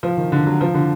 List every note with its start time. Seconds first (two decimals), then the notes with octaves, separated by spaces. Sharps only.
0.03 F3
0.17 D#3
0.32 D3
0.46 F#3
0.61 F3
0.74 D3